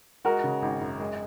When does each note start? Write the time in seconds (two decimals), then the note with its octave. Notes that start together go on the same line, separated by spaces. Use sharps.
0.24 G#3 F#4 A#4
0.44 C#3
0.62 G#1
0.81 F#2
1.00 G#3